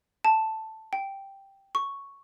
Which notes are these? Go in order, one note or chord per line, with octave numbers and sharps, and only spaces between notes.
A5
G5
C#6